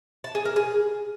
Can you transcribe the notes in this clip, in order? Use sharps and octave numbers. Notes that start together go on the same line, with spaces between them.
A5
G#4
A#4
G#4